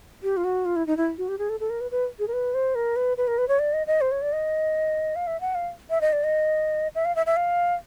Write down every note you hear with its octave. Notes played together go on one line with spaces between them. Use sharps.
G4
F4
F#4
F4
E4
D#4
E4
F#4
G4
G#4
A4
A4
A#4
B4
B4
G#4
A#4
B4
C5
A#4
B4
B4
A#4
B4
C#5
D5
D#5
D#5
C5
C#5
D5
D#5
F5
E5
F#5
F5
E5
D#5
D5
D#5
E5
F5
E5
E5
F5